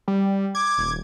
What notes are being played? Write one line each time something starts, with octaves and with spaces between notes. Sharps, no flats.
G3
D6 G#6
D#1